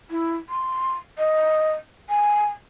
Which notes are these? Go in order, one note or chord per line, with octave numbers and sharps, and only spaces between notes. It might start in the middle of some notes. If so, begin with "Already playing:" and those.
E4
C6
D#5
G#5